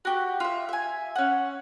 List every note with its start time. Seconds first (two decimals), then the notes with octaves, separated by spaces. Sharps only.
0.05 F#4 G4
0.40 F4 E5
0.69 E5 G#5
1.16 C#4 F#5